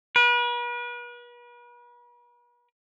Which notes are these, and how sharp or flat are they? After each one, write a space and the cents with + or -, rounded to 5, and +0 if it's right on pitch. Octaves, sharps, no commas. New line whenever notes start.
B4 -40